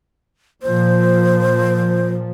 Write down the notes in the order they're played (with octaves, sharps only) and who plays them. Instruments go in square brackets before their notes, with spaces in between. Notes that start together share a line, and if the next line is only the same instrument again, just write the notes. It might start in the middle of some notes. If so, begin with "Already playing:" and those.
[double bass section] A#2 F3 [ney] C5